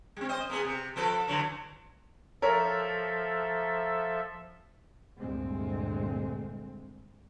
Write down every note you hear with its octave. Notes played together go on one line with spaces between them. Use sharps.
G3 C4
C5 D#5
A#3 B3 G#4
C3
F3 A4 B4
D3 E3 F#3
F3 A4 A#4 C#5 E5
D2 G2 A#2 G#3 C4